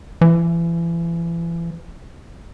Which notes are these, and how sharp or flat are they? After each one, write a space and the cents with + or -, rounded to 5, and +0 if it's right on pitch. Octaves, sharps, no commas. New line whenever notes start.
E3 +35